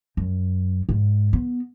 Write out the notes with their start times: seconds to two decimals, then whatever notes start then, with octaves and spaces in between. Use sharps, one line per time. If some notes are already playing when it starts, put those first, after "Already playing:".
0.17 F#2
0.89 G#2
1.33 B3